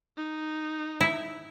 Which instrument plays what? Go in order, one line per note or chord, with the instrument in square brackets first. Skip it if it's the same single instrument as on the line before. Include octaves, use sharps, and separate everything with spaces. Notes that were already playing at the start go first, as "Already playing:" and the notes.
[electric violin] D#4
[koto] E4